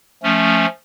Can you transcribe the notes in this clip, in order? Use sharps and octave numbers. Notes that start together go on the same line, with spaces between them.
F3 A3 C#4